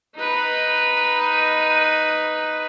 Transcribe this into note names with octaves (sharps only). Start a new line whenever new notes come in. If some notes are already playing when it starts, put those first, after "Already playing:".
D#4 B4